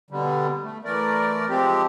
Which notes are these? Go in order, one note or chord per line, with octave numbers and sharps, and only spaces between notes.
B2 D3 G3
A3
E3 A3 A#4 D5
F3 G#3 C4 G4